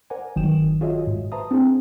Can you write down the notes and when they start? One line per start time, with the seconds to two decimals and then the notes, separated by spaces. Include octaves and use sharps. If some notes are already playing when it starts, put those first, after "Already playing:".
0.10 A#4 C5 D5 F#5 G#5
0.36 G1 D#3 F#3 G5 D#6 E7
0.81 F4 F#4 G#4 C#5 D#5 E5
1.07 G#2
1.32 B4 C5 E5 A5 A#5 D#6
1.51 C4 D4 E4 G#4 C5 F#5